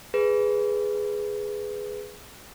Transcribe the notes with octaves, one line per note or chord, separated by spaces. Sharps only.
G#4 B4